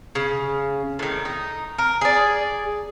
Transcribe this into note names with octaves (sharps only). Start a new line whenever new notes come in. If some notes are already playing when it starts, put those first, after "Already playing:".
C#3
A2 D#3
D#4
A#4
G#4 D5